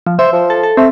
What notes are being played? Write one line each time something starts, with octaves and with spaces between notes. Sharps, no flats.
F3
C5 E5
F3
A4
A4
A3 C4